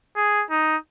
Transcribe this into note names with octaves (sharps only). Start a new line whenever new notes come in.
G#4
D#4